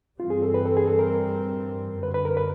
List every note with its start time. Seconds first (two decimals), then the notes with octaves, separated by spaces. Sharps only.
0.19 G2 E3 G3 C4 F4
0.30 G#4
0.42 A4
0.54 B4
0.66 A4
0.77 G#4
0.88 A4
0.99 A#4
2.02 F#2 D3 F#3 B4
2.14 B4
2.25 A#4
2.37 B4